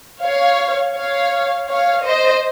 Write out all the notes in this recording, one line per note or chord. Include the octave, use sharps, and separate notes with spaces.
C#5 F5
C#5 F5
C#5 F5
C5 D#5